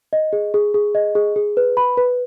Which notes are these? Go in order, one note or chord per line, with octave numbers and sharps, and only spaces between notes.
D#5
G#4
G#4
G#4
D#5
G#4
G#4
B4
B5
B4